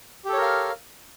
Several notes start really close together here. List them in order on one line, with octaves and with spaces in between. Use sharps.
G4 A4 C#5 A#4 F5